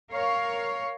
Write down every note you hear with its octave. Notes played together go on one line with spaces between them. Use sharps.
A#4 C#5 F5